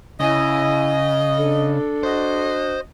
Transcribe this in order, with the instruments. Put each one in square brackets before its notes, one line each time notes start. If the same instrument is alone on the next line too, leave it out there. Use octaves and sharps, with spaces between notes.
[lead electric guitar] C#3 [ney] E4 [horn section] D#5 [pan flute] G#5
[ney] D4 [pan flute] A4
[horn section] F#4 D#5 [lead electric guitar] C5